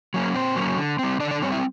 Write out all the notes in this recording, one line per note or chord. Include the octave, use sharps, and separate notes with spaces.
F#3 A#3 C#4
A#2 C4 C5
F#3 A#3 C#4
D3
G3 C4
D3 D4 D5
D4 D5
G3 C4 C#4 C#5
E4 E5